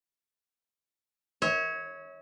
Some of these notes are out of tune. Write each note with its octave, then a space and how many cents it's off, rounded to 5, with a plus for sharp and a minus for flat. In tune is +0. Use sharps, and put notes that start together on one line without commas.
C#5 +0 E5 -40